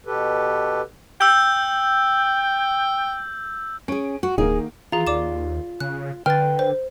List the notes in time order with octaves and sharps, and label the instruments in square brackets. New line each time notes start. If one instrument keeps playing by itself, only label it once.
[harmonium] B2 G4 A4 B4
[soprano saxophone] G5 [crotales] E6 G6
[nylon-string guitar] C#4 G#4 [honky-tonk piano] D7
[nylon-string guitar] F#4
[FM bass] D1 [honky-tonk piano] D#3 A#3 D#4 [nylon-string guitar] G#4
[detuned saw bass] E3 [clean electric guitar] F4 [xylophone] G#4 A#5
[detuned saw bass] D#2 [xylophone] D5 D6 E7
[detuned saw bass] C#3 [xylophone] F#6
[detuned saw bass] D3 [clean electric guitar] B4 G5 [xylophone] F6 A6
[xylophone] C5